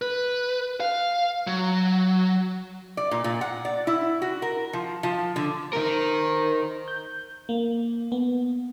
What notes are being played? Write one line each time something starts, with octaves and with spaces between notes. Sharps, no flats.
B4
F5
F#3
D5
A#2
A#2
F#5
D5
E4
F#4
A#4
F3
F3
D3
D#4 A#4 C5
G6
A#3
B3